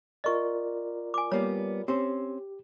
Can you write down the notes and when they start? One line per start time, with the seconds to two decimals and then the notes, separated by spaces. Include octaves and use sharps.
0.24 F4 A#4 D5 D#5 C#6
1.14 G#5 D6
1.32 G3 A#3 B3 C#5
1.88 C4 C#4 G4 C5